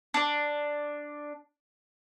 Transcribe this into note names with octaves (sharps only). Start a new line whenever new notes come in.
D4 D5